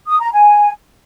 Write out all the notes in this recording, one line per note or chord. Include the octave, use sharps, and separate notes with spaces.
D#6
A#5
G#5